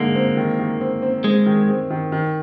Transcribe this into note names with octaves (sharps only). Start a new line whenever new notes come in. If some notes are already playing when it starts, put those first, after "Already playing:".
Already playing: D3 G#3 A#3 D#4
C4
D#3
D#3
C4
C4
G#3 C4
D#3
C4
D#3
D#3